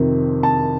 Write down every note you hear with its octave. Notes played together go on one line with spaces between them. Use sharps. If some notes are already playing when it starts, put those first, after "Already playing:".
Already playing: F2 C3 D#3
A5